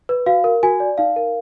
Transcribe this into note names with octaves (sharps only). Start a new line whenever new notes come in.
B4
F#4 F5
A#4
F#4 G#5
D5
D#4 F5
A#4